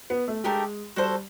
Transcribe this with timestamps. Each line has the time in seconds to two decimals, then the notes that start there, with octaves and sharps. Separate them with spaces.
0.10 B3
0.28 A3
0.44 G#3 A3 D4 G4 A#4
0.96 G3 F#4 A4 C5